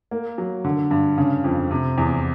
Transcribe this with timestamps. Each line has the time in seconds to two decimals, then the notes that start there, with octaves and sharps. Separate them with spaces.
0.11 A#3
0.38 F#3
0.65 D3
0.91 G2
1.18 C#3
1.44 F2
1.71 C3
1.98 E2